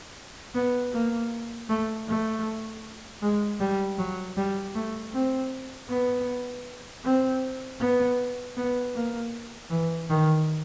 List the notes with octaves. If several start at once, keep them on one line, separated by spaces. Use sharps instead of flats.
B3
A#3
A3
A3
G#3
G3
F#3
G3
A3
C4
B3
C4
B3
B3
A#3
E3
D#3